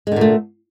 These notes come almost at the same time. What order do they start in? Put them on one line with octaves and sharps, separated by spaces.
G#3 D3 A#2 A3